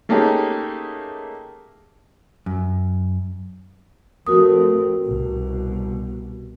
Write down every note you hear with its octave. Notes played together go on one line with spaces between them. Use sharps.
A3 A#3 C#4 D#4 G4 G#4
F#2
F3 A3 C4 F#4 A#4 D#6
C2 B2